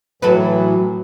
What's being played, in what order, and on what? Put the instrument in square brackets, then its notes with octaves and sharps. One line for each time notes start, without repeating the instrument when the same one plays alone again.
[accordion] A2 E3 [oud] F#3 A4 B4